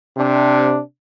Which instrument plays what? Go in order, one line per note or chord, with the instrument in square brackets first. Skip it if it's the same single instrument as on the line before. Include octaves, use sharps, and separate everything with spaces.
[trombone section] C3 D4